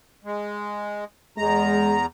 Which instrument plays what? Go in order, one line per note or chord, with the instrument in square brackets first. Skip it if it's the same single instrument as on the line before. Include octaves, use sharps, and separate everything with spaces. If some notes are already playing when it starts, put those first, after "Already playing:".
[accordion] G#3
[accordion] E2 A#5 [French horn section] G#3